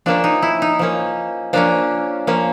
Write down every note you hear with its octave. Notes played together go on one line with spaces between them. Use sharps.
F3 A#3 C#4 D4
D#4
E4
D#4
F3 A#3 C#4
F3 A#3 C#4 D4
F3 A#3 C#4